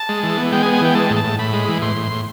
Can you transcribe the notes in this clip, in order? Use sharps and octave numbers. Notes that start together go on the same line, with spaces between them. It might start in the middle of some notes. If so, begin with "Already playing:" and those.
Already playing: A5
G#3
E3
B3
G#3 G5
G#5
B3
G#5
E3 G5
G#3 A5
A2
A5
A2
A2 B5
G#3
E3
A2 C6
A2
A2